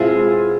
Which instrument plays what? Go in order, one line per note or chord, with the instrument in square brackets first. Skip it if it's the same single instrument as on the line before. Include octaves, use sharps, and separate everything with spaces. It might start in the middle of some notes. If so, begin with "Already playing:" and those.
Already playing: [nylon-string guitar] B2 G#3 C4 E4 G#4 [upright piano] F4